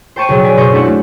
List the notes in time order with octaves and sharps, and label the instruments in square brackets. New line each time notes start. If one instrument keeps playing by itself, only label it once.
[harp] C5 G5 A5 C#6 D#7
B1 C#3 F#3
D5 G#5 B6
F#1 B2 C5 D#5 C#6 G6
A3 D4 E4 A4 F#5
A3 F#4